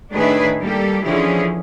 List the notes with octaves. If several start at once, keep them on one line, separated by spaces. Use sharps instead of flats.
A2 D#3 D4 G#4 B4 E5
G3 A#3 G4 A4
D3 E3 F3 C#4 E4 G#4